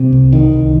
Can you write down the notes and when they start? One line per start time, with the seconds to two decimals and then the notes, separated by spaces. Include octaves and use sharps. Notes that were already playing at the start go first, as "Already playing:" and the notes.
Already playing: C3
0.13 C2
0.33 D#3
0.53 C2